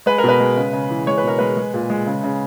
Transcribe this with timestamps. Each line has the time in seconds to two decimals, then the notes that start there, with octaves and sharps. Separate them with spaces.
0.06 G#3 B4
0.18 A#4
0.24 B2
0.29 B4
0.40 G#3
0.57 C#3
0.73 C#3
0.91 E3
1.07 G#3 C#5
1.18 B4
1.24 B2 A#4
1.38 G#3 B4
1.57 G#3
1.74 A#2
1.90 G#3
2.07 C#3
2.24 C#3